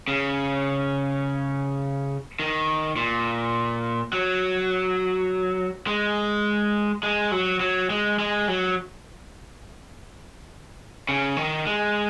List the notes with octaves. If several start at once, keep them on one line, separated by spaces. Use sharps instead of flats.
C#3
D#3
A#2
F#3
G#3
G#3
F#3
F#3
G#3
G#3
F#3
C#3
D#3
G#3